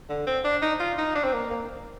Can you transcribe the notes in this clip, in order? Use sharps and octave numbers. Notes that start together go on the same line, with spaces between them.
D3
C4
D4
D#4
F4
D#4
D4
C4
A#3
A#3